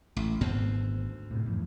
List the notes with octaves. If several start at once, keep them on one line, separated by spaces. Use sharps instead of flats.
A1 A3
G#1 D2 G#2 B3 C4
A2 C3
F2 A2 E3